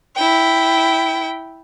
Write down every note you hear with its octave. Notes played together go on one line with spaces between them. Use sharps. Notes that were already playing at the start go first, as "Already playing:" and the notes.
E4 G5